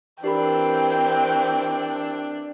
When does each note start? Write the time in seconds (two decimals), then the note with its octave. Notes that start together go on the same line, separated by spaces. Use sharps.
0.24 E3 C4 D4 G4 A#4 G5 B5